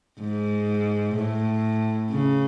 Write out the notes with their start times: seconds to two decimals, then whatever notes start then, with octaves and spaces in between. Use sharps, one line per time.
0.20 G#2
1.16 A2
2.10 C#3